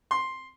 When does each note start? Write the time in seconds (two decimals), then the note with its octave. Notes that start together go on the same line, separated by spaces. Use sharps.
0.11 C6